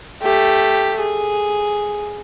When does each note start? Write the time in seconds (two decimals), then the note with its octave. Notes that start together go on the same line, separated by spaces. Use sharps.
0.23 A3 G4
1.00 G#4